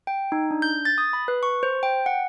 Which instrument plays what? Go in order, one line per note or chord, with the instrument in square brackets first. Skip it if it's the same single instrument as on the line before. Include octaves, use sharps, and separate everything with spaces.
[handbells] G5
D#4
D4
G6
A6
D#6
B5
B4
C#6
C5
G5
F#5